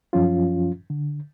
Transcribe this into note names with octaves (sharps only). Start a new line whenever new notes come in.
F#2 F3 C#4 F4
D3